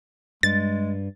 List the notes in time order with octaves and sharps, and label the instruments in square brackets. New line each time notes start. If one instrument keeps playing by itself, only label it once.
[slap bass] G2 [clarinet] G#3 [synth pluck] A6